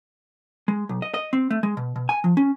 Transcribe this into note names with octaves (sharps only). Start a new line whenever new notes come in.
G#3
B1
D#5
D#5
C4
A3
G#3
B2
B2
G#5
F3
C#4